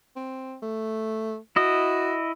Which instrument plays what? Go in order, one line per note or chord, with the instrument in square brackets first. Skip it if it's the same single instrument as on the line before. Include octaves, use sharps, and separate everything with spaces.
[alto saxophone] C4
A3
[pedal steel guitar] E4 D#5 [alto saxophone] F#4